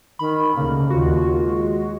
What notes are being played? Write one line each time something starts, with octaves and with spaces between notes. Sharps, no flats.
D#3 B5
D2 C#3 A#3
D#2 F4 F#4
G#3